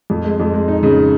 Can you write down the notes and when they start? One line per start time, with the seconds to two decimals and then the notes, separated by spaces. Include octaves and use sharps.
0.10 F2
0.24 G#3
0.40 F2
0.54 G#3
0.68 D#4
0.83 C#3